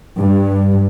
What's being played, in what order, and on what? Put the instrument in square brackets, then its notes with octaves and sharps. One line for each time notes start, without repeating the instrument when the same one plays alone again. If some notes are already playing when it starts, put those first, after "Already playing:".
[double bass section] G2